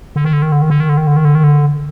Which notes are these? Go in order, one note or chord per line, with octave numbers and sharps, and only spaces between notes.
D3
D#3
D3
D#3
D3
D#3
D3
D#3
D3
D#3
D3
D#3
D3
D#3
D3